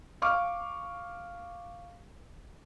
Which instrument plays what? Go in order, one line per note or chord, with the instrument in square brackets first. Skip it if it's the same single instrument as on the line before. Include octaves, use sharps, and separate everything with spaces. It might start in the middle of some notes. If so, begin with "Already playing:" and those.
[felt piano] F5 C#6 D6 F6